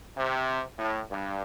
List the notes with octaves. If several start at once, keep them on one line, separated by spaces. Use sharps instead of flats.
C3
A2
G2